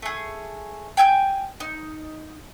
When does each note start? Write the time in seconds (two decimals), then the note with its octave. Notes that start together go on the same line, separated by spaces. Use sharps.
0.02 A3 G#4
0.97 G5 G#5 E6 G6
1.60 D#4